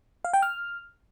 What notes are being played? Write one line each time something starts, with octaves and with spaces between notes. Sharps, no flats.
F5
G5
F6